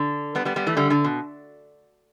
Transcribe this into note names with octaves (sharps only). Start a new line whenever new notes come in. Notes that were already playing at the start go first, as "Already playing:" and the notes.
Already playing: D3
G3 B3
G3 B3
G3 B3
E3 A3
D3 G3
D3
B2